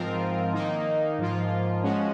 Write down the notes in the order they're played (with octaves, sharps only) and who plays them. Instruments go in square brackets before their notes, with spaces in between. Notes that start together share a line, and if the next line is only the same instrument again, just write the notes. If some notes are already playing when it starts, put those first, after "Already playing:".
Already playing: [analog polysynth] G#2 F3 C4 F4 A#4
D#3 A#3 D#4
G#2 F3 A#3 F4
F3 G#3 C#4 F#4